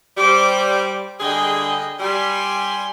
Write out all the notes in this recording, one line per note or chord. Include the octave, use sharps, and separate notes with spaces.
G3 C5 D6
D3 G3 G#4 D#5 G5
G3 G#5 C6